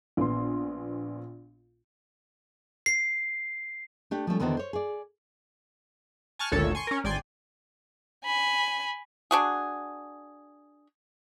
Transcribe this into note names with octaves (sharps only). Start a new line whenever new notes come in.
A#1 B3 C6
C7
A3 D4 G4
F3 G3 A3 C#4
E2 D3 D#3 B3 F#4 C5
C5 C#5
G#4 D5
G#5 A5 C#6 F6 F#6
G#1 D2 A#2 A4 C#5 E6
G#5 C6 C#6
C#4 A#4
G#1 D5 G5 G#5 C6
G#5 B5
D4 F#4 G#4